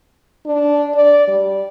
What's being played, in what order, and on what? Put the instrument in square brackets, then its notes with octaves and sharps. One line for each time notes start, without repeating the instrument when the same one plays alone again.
[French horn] D4
D5
G3